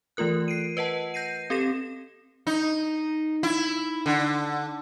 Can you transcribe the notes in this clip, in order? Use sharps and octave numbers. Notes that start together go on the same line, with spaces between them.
E3 A3 F4 A#4 F#6
C7 D7 D#7
B4 D#5 F#5 A5
G6 A#6 C7 D#7
C4 G4 A4 A#6 E7
D#4
E4
D3